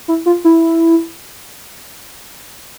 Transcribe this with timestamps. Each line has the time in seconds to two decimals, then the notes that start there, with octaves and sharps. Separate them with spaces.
0.08 E4
0.26 F4
0.45 E4